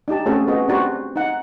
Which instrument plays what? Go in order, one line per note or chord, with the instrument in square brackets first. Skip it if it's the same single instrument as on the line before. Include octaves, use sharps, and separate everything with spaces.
[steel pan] D4 D#4 G4 A5
A3 C4 C#4 F#4 G#4 A4
B3 F#4 G#4 D#5
C4 D4 F#4 G4 C5
D#4 F#5